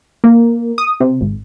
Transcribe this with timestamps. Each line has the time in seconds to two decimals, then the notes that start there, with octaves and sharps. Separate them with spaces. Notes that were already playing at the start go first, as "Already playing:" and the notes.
0.24 A#3
0.78 D#6
1.00 C3
1.21 G#1